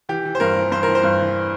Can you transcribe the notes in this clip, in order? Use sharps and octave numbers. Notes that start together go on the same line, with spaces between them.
E3 G4
E3
C5
G2 A#4
E3
G2 C5
E3 A#4
C5
G2
E3